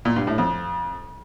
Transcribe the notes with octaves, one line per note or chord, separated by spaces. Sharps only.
A#2
G2
A2
F2